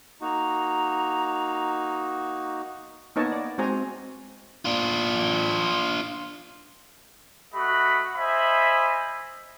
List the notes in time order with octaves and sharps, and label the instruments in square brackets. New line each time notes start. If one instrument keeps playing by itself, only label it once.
[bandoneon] A#3 D#4 F#4 [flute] A#5
[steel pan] A#3 B3 D#4 C#5 D#5 A5
D5
G#3 C4 F#4 C5 G#5 A#5
[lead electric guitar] D4 F4
[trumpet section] A3 F#4 D#5 F#5 B5
C5 D#5 E5 G#5 B5